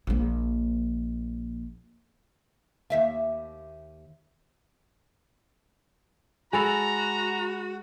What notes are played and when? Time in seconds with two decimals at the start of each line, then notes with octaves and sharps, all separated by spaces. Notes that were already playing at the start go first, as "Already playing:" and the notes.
0.07 A#1 A#3
2.90 D#2 E5 F5
6.53 G#3 F#4 A4 G#5 A#5 B5 F7